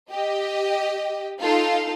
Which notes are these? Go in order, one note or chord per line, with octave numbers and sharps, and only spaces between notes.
G4 D#5
D#4 F4 A4